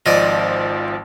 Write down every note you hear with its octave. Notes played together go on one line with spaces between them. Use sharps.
G#1 F3 D5 D#5